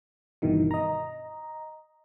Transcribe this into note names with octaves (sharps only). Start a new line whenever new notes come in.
G1 G2 B2 D#3 E3
D#5 A#5